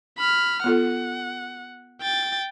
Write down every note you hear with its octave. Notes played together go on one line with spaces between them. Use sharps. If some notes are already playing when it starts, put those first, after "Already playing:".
B5 F6
B3 F4 A4 F#5
G5 A6